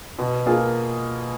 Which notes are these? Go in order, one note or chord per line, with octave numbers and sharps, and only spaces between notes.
B2
A#3 F4 G#4